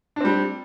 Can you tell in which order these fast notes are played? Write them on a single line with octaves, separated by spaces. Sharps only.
D4 C4 G3